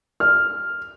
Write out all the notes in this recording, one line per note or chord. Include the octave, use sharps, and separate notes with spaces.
F6